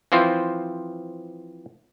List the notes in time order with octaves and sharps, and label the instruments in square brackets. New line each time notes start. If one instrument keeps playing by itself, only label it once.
[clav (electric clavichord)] E3 F3 C4 F4 C5